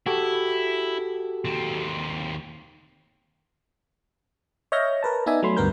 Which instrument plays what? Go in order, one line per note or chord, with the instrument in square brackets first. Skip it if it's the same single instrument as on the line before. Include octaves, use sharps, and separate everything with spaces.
[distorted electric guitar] E4 [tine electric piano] F#4 G4 A4
[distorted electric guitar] D#2 C4
[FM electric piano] C#5 D#5 E5 F6 G6 A#6
A#4 B4 A5
B3 D#4 D5 E5 G#5
F#3 A3 B5 C6
D2 G2 B3 A#4 G6